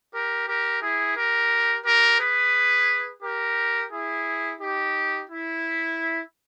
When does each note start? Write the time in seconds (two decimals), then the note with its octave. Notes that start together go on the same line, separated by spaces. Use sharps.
0.13 G4 A#4
0.48 G4 A#4
0.82 E4 G#4
1.16 G4 A#4
1.85 G4 A#4
2.20 G#4 B4
3.23 G4 A#4
3.91 E4 G#4
4.60 D#4 G4
5.28 E4